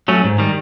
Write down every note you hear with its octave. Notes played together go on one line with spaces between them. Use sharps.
F#3 A3 C#4
G#2
D#3 G3